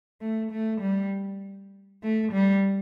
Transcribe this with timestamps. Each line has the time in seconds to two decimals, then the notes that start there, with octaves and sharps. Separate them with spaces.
0.21 A3
0.52 A3
0.81 G3
2.03 A3
2.33 G3